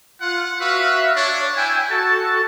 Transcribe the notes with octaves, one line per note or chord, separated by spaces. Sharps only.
F4 F#5
F#4 B4 E5 F5
D4 C#5
E4 G5 G#5 E6
F#4 A4 A5